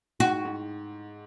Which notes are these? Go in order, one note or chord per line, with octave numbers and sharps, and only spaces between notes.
G#2 F#4
G#2